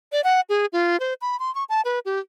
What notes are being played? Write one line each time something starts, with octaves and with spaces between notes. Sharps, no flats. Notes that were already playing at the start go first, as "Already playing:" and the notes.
D5
F#5
G#4
F4
C5
B5
C6
C#6
A5
B4
G4